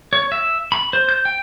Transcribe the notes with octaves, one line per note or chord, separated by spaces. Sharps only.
C#5
E5
B5
C5
G6
G5